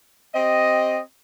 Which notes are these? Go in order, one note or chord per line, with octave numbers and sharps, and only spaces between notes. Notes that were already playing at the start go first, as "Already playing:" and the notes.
C4 G4 D#5